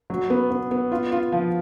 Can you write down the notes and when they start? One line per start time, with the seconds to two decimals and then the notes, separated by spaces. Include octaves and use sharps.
0.10 F#3
0.30 B3
0.50 B3
0.71 B3
0.91 F4
1.12 F4
1.32 F3